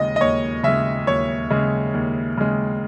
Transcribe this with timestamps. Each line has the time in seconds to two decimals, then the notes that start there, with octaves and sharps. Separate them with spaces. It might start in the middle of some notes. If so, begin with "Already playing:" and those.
Already playing: D#2 C#3 G#3 D#5
0.16 D#5
0.21 D#2 C#5
0.63 C#3 G#3 E5
1.07 D#2 C#5
1.50 C#3 G#3
1.94 D#2
2.37 C#3 G#3